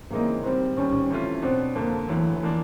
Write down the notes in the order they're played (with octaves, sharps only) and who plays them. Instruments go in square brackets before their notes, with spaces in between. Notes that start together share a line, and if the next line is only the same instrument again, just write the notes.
[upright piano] C#3 E3 G#3 C4 D#4 [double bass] A#3
[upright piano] G#2 D#3 G3 [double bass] C4
[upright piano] D#2 D#3 G3 [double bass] C#4
[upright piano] C3 E3 A3 C#4 F4
[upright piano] B2 F#3 B3 D4 [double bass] C4
[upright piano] F2 D3 F3 [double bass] A#3
[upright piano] D2 D3 F#3 [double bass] E3
[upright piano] F3 A#3 D4